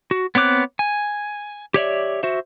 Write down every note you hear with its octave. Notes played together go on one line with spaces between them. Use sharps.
F#4
B3 C4 C#5 D6 F#6
G#5
G4 C#5 D5 E5
F#4 C5 E5